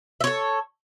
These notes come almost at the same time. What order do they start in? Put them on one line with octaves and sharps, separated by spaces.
E5 C#5 A4